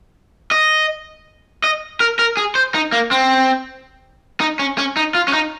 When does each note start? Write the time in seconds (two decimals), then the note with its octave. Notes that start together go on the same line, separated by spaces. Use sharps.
0.51 D#5
1.64 D#5
2.00 A#4
2.19 A#4
2.37 G#4
2.55 C5
2.75 D#4
2.92 A#3
3.11 C4
4.40 D#4
4.59 C#4
4.78 C#4
4.97 D#4
5.15 F4
5.28 C#4
5.33 D#4